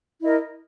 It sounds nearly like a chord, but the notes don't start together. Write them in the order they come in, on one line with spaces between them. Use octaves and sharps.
E4 D#5 A#4